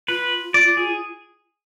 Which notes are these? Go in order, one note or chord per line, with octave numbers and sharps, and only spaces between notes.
F4 B4
D5
G#4